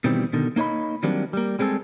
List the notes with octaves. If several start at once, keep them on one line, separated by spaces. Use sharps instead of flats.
B2 D#3 E3 G3 C4
B2 D3 D#3
A#3 D#4 C#5 D#5 B5
D#3 F#3 G3 A#3 C4 D4
G3 A#3
G3 G#3 C4 G#4 A4